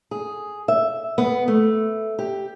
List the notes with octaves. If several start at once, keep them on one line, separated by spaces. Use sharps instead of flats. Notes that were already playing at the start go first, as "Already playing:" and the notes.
G#4
E5
B3
A3
G4